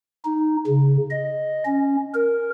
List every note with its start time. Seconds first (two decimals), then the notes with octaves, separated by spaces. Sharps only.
0.25 D#4
0.67 C#3
1.11 D#5
1.66 C#4
2.14 A#4